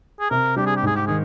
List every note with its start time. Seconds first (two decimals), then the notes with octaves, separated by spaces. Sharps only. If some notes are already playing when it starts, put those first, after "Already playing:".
0.20 G#4
0.30 C3 A#4
0.56 G3 D4 G4
0.66 G#4
0.76 G4
0.83 G#2 G#4
0.96 G4
1.07 D#3 G#4